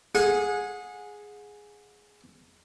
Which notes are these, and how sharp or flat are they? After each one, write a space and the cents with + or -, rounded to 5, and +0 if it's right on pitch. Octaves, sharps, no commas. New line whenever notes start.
G#4 +0 F#5 -30